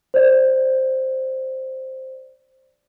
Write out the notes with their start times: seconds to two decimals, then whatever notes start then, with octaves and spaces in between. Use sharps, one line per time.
0.14 C5 D5